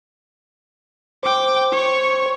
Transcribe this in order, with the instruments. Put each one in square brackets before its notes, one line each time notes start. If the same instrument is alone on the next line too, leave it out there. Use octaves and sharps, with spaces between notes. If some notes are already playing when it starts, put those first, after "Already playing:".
[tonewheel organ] C5 [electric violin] G5 D6
[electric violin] C#5 C#6